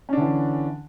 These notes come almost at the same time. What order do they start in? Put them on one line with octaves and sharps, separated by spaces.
C#4 D4 D3 E3